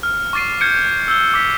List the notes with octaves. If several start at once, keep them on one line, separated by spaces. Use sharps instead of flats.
F6
C#6 D6 A6 C7 D#7
F6 G6 G#6 C#7 D7
E6 G6 G7
D6 B6